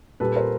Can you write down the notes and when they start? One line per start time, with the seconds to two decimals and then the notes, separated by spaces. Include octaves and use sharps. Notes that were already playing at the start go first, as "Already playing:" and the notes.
0.20 A#2 G3 A4 B4
0.36 A#4 C5